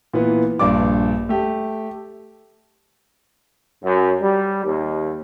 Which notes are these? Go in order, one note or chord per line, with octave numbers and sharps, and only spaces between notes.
A#2 E3 B3
A#1 G2 D5 D6
A3 G4
F#2
G3
D#2